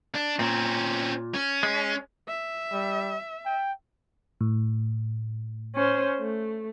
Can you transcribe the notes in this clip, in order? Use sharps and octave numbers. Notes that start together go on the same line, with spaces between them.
D4
A#2 C4 C#4
C#4
G#3
E5
G3
G5
A2
C#4 C5
A3